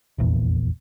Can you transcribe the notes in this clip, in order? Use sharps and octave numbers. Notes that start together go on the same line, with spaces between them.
F1 A#1 E2 A#2